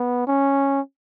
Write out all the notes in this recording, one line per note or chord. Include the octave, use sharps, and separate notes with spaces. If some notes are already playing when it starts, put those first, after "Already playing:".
Already playing: B3
C#4